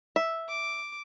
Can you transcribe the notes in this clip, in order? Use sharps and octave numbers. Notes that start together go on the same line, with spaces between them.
E5
D6